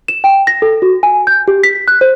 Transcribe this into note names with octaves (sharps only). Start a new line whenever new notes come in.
E7
G5
A#6
A4
F#4
G#5
G6
G4
B6
F#6
C5